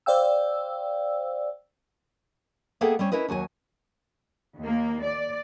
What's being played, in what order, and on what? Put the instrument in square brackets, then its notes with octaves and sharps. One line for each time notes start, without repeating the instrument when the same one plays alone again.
[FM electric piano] C5 D5 F5 G5 E6
[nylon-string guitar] A#3 B3 G#4 A4 E5 G5
G3 C4 C#4
C#4 E4 A#4 B4 D#5
D#2 F#3 F#4 G#5
[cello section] D#2 A#3
D5